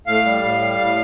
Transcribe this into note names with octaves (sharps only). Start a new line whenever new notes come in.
A2 F5
G3
A2
G3
A2